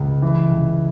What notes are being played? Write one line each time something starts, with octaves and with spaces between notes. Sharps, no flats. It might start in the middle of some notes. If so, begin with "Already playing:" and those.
Already playing: C#2
E3
C#2